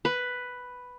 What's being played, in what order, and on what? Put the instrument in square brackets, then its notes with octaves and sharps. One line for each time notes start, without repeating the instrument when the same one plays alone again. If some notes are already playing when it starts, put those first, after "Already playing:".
[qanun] B4